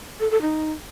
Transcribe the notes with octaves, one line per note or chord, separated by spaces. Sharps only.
A4
A4
D#4